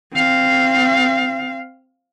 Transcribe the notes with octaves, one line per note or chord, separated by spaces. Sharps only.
C4 F5